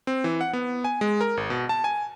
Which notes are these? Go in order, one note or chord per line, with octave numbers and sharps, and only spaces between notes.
C4
E3
F#5
B3
G#5
G#3
A#4
G#1
B2
A5
G#5